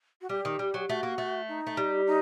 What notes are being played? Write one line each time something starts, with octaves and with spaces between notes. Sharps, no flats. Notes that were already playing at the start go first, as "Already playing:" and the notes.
F#4
G3 G4
D#3
G3
F#3
A3 F#4
A#3
A3
D#4
A3
G3
D#4